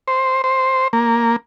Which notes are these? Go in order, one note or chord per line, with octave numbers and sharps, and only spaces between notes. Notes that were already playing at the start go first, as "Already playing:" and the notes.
C5
C5
A#3